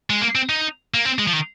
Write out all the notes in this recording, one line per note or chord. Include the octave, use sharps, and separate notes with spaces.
G#3
A#3
C4
D#4
A#3
C4
G#3
F3
D#3